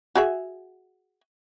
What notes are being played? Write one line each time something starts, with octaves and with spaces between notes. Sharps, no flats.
F#4 G#4 E5